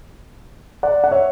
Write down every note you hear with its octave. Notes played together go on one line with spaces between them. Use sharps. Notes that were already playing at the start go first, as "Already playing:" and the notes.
D5 F#5
F#5
C#5 E5